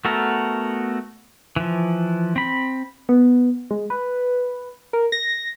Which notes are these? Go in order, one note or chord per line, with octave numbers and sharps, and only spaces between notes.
A3 B3 F#4 A4 A#4
E3 F3
C4 B5
B3
G#3
B4
A#4
A#6